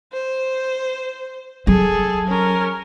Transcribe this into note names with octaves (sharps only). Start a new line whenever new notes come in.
C5
F#3 G#4 A4
C#4 A#4